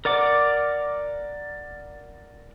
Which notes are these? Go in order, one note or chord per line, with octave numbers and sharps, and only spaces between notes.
A#4 D5 F#5 D6